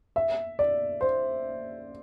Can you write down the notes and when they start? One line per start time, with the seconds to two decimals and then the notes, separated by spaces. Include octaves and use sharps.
0.16 E5
0.59 D5
1.01 C5